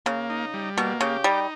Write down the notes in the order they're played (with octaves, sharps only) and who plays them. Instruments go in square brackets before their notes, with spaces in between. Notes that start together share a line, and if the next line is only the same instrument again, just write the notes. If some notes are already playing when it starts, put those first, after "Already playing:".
[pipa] C#3 [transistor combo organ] A#3
[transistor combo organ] D#4
G3
[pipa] B2 [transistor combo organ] A#3
[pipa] C#3 [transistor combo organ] G4
[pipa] G3 [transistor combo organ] D#4